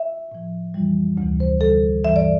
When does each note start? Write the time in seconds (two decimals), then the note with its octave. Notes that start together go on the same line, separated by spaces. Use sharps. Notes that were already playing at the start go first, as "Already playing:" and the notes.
Already playing: E5
0.32 A2 F3
0.74 F2 E3 G3
1.18 D2 C3 E3
1.40 C5
1.61 D2 D3 G3 A4
2.04 G2 E3 G3 E5
2.16 D5